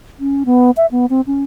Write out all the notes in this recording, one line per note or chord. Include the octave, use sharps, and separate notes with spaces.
C#4
B3
E5
B3
C4
C#4